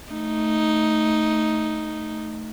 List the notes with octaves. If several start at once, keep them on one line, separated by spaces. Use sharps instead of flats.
A3 D#4